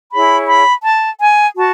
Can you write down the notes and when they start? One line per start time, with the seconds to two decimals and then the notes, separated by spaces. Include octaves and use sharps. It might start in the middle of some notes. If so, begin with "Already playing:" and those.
0.12 E4 G#4 C#5 B5
0.49 B5
0.84 A5
1.21 G#5
1.57 F#4 A5